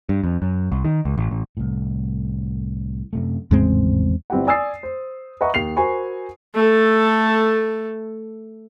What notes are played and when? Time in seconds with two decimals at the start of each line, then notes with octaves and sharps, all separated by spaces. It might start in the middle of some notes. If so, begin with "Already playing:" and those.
0.09 G2
0.24 F2
0.42 F#2
0.72 C2
0.85 D#3
1.05 C#2
1.18 A1
1.31 A1
1.57 C2 A2
3.13 F#2 C3 A3
3.51 G#1 E2 A2 C#3 G#3 C4
4.30 G1 C4 E4 G4 F#5
4.47 D5 G#5 D#6 E6 A6 C7
4.83 C5
5.41 B4 D#5 E5 F#5 A#5 C#6
5.54 D#2 C7 F7
5.76 F#4 A#4 C5 G#5 B5 C#6
6.55 A3 A4